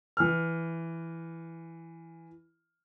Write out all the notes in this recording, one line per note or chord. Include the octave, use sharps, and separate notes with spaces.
E3 F6